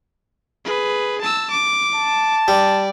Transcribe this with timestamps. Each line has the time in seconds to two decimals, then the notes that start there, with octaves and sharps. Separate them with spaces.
0.65 G#4 B4
1.21 A5 E6
1.51 D6
1.95 A5
2.48 G3 D5